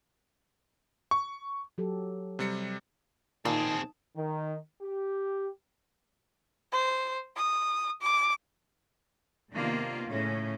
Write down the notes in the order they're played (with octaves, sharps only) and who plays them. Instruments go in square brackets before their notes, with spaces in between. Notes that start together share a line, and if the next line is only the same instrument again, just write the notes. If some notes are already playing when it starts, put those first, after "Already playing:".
[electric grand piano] C#6
[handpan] F#3 G4 A4
[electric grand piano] C3 G3 C#7
[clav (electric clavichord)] A#2 [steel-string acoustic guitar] D#3 [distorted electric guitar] C4 G#4 [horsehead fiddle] A5
[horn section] D#3
G4
[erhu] C5
D#6
D6
[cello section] C3 D#3 A#3 B3 D4 F4
A2 C#3 C#4